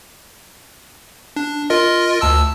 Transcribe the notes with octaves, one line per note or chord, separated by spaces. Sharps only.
D4
F4 A#4 D#5
D2 A5 E6